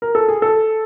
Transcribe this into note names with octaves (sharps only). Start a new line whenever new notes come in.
A#4
A4
G#4
A4